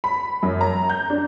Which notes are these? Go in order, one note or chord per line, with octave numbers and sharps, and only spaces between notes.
B5
F#2
A#5
G6
D4